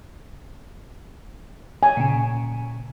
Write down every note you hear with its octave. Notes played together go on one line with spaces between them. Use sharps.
G#5
A#2 C#3